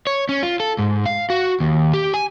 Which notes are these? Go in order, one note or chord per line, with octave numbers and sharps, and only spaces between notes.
C#5
C#4
F4
A4
G#2
F5
F#4
D#2
G4
G#5